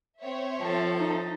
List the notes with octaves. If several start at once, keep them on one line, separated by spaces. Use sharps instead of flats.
C4 C#5 E5
F3 A4
D#4